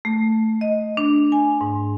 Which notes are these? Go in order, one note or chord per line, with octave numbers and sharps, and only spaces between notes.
A3
D#5
D4
G#5
G#2